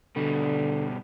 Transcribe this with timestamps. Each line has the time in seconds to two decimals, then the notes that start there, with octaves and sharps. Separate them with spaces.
0.16 B2 D3 G3